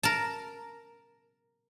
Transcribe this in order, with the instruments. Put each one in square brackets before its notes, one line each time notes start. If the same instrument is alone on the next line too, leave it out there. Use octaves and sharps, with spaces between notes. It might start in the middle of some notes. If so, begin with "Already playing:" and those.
[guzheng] A#4 A5